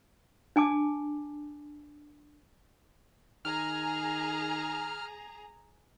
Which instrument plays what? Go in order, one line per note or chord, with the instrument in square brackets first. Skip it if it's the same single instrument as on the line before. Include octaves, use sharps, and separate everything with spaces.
[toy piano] D4 G#5 A5 D6
[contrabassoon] D#3 [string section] G#4 A#5 [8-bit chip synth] F6